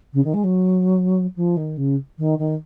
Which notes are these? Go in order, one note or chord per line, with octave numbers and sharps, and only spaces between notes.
C#3
D#3
G#3
F#3
F3
D#3
C#3
D#3
D#3